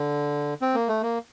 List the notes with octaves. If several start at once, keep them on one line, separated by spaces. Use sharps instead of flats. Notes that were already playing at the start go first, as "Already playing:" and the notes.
Already playing: D3
C4
A#3
A3
A#3